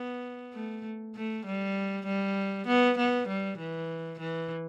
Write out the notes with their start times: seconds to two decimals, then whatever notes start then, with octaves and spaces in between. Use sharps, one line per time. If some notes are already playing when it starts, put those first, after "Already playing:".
Already playing: B3
0.54 A3
1.16 A3
1.46 G3
2.06 G3
2.67 B3
2.98 B3
3.28 G3
3.58 E3
4.19 E3